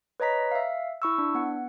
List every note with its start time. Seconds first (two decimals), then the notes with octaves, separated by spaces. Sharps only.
0.20 B4 C#5 D#5 A#5 B6
0.51 E5 F5
1.02 E4 C#6 E6
1.18 D4
1.35 B3 F#5